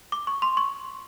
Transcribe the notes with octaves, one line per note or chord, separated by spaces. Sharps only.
D6
C#6
C6
C#6